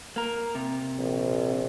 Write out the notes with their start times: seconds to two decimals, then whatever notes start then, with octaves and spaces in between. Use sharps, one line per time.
0.16 A#3 A#4
0.55 C3
0.99 A#1